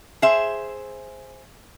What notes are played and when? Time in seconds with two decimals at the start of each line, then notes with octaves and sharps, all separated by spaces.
0.22 G#4 C5 E5